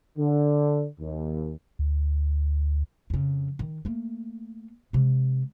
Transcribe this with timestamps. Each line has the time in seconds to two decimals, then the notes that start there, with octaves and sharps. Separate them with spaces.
0.18 D3
1.01 D#2
1.79 D2
3.10 F2 C#3
3.59 D#3
3.85 A3 A#3
4.93 C3 G#3